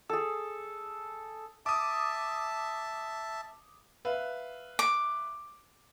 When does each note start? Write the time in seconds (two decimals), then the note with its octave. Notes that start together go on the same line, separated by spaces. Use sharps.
0.09 G#4 A4
1.66 E5 A5 D6 D#6
4.05 B4 E5 F5
4.79 D6